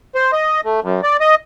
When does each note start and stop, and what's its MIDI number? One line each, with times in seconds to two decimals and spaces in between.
0.15 0.31 72
0.32 0.61 75
0.64 0.80 57
0.83 1.01 42
1.03 1.17 74
1.20 1.35 75